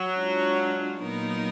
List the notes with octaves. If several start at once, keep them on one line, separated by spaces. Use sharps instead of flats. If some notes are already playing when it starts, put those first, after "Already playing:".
Already playing: F#3
G#3 D4 F4
A#2 F#3 B3 D#4 A#4